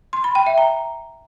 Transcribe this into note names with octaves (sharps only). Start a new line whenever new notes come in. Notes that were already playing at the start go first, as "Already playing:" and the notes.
C6
B5
G5
E5
A#5